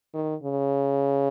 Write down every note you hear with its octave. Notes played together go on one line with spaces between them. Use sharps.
D#3
C#3